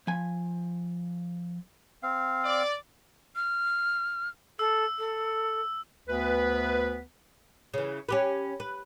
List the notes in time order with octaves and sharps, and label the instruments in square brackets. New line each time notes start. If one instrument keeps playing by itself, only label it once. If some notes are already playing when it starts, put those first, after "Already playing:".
[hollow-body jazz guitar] F3 G#5
[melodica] C4 F5
[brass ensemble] D5
[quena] F6
[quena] A4 [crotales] E6
[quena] A4
[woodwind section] D2 B3 B4
[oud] C#3 E3
C#4 G4 B4
B4